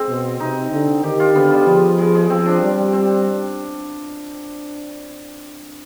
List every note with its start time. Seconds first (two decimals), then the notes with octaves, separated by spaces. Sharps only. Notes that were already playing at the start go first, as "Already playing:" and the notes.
Already playing: G#3 C4
0.08 B2
0.40 C3 D#4
0.71 D3
1.03 D#3 G4
1.19 F4
1.35 D3 B3
1.51 G3
1.66 F3 G#3
1.98 G#3
2.14 G#3
2.30 F3 C4
2.46 D4
2.61 G3
2.93 C4